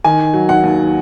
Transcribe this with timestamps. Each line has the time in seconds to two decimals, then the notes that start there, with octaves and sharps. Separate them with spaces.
0.04 D#3 G#5
0.34 F#3
0.49 F#5
0.63 D#2